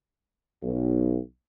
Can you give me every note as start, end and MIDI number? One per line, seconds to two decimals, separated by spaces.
0.63 1.18 35